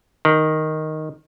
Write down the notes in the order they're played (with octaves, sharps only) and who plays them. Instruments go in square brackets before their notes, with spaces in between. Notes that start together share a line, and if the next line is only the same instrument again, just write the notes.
[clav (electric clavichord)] D#3